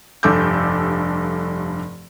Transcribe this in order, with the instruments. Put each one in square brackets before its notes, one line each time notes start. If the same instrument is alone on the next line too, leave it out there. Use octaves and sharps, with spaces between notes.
[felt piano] F1 G2 A4 D6 E6 G6